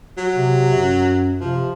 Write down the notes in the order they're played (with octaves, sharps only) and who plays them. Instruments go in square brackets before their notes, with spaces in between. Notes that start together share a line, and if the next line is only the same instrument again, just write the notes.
[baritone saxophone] F#3
[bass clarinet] C3
F#2
[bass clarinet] C3 [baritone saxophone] F3